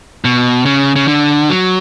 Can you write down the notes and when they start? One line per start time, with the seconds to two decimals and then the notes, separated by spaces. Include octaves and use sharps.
0.25 B2
0.66 C#3
0.96 C#3
1.08 D3
1.50 F#3